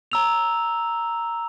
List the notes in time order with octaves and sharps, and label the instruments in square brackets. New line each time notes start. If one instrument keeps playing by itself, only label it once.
[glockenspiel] A#5 E6 F7